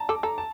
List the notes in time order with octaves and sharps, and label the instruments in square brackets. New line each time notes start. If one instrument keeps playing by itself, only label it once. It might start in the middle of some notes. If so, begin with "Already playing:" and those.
Already playing: [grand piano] A5 A#5
[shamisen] A4 [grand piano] D6
[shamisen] A4 [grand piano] A#5
[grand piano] A5